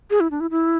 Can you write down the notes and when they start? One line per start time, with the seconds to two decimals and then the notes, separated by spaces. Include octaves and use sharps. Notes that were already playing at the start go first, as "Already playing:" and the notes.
0.10 G#4
0.20 E4
0.31 D4
0.40 E4
0.51 E4